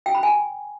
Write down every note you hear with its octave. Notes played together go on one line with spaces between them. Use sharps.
G5
B5
G#5